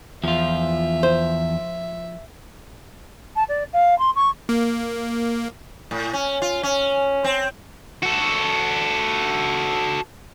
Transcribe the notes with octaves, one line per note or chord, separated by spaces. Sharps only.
E2 F3 F4 E5
C5
A5
D5
F5
C6
C#6
A#3
A2
C#4
F4
C#4
C4
F#4 A4